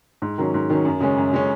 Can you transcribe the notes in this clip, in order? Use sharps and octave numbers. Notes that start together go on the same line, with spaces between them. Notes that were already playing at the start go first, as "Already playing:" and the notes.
G#2
D#3 F#3 C#4
G#2
D#3 F#3 C#4
F#2
C#3 G#3 C#4
F#2
C#3 G#3 C#4